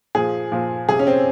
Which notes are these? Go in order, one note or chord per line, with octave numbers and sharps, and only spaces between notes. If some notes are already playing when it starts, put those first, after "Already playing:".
A#2 F3 G#4
A#2 F3
C3 F3 G#4
C#4
C4